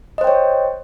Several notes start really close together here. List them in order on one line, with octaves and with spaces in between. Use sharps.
D#5 C5 G5 C#5